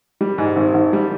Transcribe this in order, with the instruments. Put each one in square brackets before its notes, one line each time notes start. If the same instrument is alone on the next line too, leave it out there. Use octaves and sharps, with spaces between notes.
[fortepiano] G3
G#2
G#1
G#1
G3